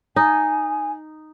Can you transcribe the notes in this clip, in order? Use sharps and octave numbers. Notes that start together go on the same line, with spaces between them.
D#4 G#5